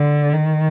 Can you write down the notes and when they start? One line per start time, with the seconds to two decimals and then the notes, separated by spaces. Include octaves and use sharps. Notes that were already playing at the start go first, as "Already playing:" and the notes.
Already playing: D3
0.33 D#3